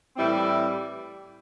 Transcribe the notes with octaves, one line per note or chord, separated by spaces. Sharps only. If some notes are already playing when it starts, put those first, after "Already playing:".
A2 E3 G3 C4 E4